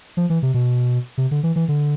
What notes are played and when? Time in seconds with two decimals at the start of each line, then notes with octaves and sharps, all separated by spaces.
0.17 F3
0.30 E3
0.43 C3
0.54 B2
1.18 C3
1.31 D3
1.43 E3
1.56 E3
1.68 D3